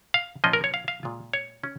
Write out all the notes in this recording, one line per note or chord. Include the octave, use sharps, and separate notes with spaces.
F5
A#2 F3 C#4 F4 D#5
A#4
C#5
F5
F5
A#2 G#3 F4
C#5
C#4